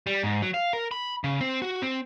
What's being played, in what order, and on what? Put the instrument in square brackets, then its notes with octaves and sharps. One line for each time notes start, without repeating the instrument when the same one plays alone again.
[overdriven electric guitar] G3
G#2
F#3
F5
A#4
B5
C#3
C4
F#4
C4